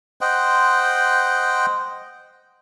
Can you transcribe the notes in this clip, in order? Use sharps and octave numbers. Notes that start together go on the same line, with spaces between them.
C5 D#5 F#5 G5